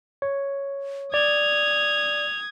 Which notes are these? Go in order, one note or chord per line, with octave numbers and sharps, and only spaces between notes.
C#5
D5 D#6 G#6 F7